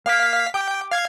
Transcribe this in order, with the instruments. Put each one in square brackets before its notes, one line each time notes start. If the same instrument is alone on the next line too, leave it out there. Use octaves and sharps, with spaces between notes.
[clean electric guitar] A#3 [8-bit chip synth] F5 B6
[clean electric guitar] G4 [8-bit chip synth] G5
[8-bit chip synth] F5 G#6